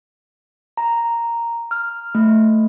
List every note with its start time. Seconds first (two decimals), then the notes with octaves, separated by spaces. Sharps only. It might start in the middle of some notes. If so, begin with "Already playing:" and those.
0.77 A#5
1.71 F6
2.15 A3